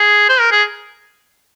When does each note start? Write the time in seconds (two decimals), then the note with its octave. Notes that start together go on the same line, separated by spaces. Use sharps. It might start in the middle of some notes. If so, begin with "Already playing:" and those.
Already playing: G#4
0.29 C5
0.40 A#4
0.51 G#4